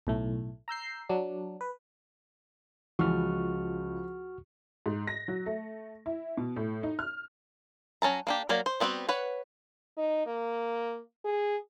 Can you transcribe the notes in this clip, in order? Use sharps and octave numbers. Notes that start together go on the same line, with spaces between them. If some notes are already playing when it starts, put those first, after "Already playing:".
B1 A2 A3
A#5 E6 G6 C7
F#3 D4
B4
C#2 E3 F3 F#4 C#6 F6
G#2
A#6
F#3
A3
E4
B2
A2
D#4
F6
F#3 C#4 A5 A#5
A#3 D4 G4
F#3 A#3 A#4 D5
C5
G3 B3 C4 D#4 F#4
B4 C#5 F#5
D#4
A#3
G#4